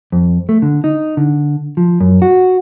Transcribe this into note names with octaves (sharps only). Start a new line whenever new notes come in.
F2
A3
D3
D#4
D3
F3
F#2
F#4